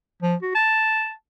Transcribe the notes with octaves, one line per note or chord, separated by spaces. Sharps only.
F3
F#4
A5